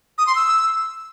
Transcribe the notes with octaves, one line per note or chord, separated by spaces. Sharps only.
D#6
C6
E6